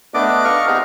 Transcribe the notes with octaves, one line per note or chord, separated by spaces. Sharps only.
A3 B3 D4 D5 D#5 D6
D#5 F5 C#6 F6
B3 C4 D#4 G4 G#4 A#5